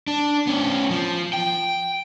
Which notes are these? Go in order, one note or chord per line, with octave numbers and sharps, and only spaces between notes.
D4
B3 C#4
F3
G5